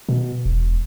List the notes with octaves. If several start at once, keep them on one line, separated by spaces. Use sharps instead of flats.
B2
E1